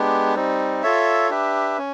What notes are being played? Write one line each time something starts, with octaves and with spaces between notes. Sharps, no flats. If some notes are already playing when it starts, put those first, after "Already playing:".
Already playing: G#3 B3 D4 G4
G3 C4 D#4
F4 A4 C#5 E5
D4 G4 B4 E5
C#4